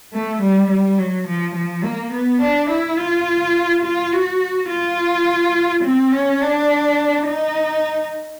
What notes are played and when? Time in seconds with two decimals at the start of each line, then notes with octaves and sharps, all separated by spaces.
0.13 A3
0.41 G3
0.70 G3
0.98 F#3
1.27 F3
1.55 F3
1.84 A#3
2.13 B3
2.41 D4
2.70 E4
2.98 F4
3.83 F4
4.12 F#4
4.69 F4
5.83 C4
6.12 C#4
6.41 D4
7.27 D#4